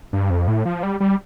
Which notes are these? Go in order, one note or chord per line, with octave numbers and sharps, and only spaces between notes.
G2
F2
A2
F3
G3
G3